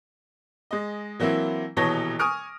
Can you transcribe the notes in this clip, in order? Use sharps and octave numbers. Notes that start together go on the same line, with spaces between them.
G#3 D#5
E3 F#3 A#3 C4 E4
D#1 B2 E3 C#5 A5 A#6
G#5 C#6 D#6 F6 D7